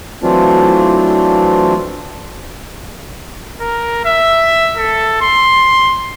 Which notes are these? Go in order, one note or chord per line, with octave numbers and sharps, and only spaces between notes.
E3 F#3 A3 C4 D4 F4
A#4
E5
A4
C6